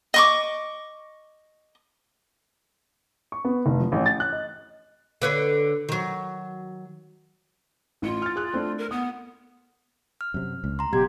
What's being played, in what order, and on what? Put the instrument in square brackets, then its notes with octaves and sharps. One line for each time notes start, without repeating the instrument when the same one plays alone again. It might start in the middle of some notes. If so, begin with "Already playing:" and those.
[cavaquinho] D#5 C#6 D6
[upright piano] C#6
B3
F1
F3
A1
A6
F#6
D#5
[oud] D3 B4 C#5
D#3 F#3
[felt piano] A1 C#7 [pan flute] F4
[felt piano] F6 A6
G#4 F#6
A3 C4 D4
[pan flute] A#4
[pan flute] B3 [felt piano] D#6
[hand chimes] F6
[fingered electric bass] F#2 C3
C#2
[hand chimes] A#5 C6
[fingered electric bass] F#1 B2 F#3 [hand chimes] B3 G#6 [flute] G4